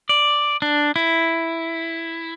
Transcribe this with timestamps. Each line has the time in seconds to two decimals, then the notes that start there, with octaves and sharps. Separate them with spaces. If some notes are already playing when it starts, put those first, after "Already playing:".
0.09 D5
0.62 D4
0.96 E4